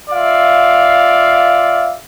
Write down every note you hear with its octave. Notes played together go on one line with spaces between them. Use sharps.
F4 D5 E5 F5